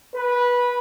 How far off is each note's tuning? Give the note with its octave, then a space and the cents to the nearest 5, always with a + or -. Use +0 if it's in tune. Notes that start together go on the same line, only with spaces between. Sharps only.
B4 -15